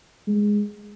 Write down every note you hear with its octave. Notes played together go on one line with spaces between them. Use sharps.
G#3